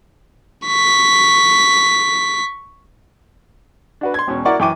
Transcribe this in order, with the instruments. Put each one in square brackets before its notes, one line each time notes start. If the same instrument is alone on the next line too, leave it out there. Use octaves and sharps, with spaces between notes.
[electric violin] C#6 B6
[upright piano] D4 F#4 B4
C6 G#6
E1 B2 C#4
E4 F#4 A#4 D5 F#5 C#6
F#2 E3 G5 C#6 D6 D#7